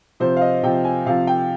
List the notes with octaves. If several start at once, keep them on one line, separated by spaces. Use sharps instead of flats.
C3 F3 C5
F5
D#5
C3 F3 G5
G#5
C3 F3 F5
G5